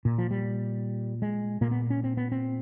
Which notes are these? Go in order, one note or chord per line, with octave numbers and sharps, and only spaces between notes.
A#2
F3
G3
G#3
A#2 A#3
B3
C#4
C4
B3
C4